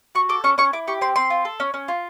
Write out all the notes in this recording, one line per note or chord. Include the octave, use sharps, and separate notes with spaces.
F#4 C#6
A4 D6
C#4 C#6
C#4 C#6
E4 D6
G4 C#6
C4 C6
C4 C6
F4
A4
C#4
C#4
F4